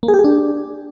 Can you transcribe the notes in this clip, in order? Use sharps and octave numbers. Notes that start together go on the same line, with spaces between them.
A#3
G#4
G4
G#4
D4